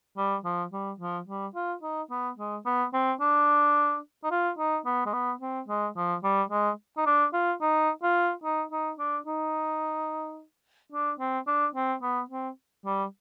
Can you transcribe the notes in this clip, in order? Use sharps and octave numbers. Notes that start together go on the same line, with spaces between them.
G3
F3
G3
F3
G3
F4
D#4
B3
G#3
B3
C4
D4
D#4
F4
D#4
B3
G#3
B3
C4
G#3
F3
G3
G#3
D#4
D4
F4
D#4
F4
D#4
D#4
D4
D#4
D4
C4
D4
C4
B3
C4
G3